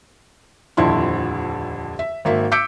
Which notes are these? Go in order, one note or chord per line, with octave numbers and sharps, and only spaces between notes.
D#1 F2 D3 E4 C6
E5
G#1 A#3 E5
D6 E6 G6 B6 C#7 D7